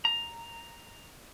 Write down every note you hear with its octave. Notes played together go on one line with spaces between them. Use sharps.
A#5